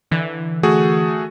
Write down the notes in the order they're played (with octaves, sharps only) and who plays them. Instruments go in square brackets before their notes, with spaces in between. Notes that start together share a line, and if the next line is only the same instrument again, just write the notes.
[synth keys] D3 E3
[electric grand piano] A3 F#4 G#4